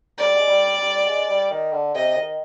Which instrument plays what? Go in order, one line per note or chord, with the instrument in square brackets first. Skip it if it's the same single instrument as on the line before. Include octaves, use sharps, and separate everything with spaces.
[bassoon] G3 [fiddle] D5
[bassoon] G#3
G3
G3
G#3
G3
D#3
D3
[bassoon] C3 [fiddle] D#5
[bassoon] D#3